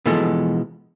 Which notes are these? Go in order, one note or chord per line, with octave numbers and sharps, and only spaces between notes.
B2 E3 F3 G#3 A4